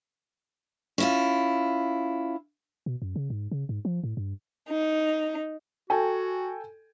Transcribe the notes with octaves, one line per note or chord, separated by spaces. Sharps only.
C#4 E4 F4
B2
F#2
C#3
G#2
C#3
G#2
F3
A2
G2
D#4
F#4 A4 G5 G#5